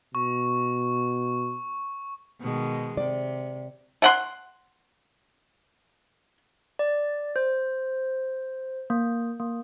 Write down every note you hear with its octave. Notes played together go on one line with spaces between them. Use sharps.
B2 C#6
B2 D#3 G#3
C3 D5
A3 F#5 C6
D5
C5
A#3
A#3